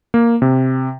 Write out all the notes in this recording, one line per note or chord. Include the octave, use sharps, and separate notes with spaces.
A#3
C3